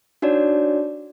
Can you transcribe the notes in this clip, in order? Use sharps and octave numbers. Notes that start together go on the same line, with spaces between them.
D4 D#4 F#4 C#5 D5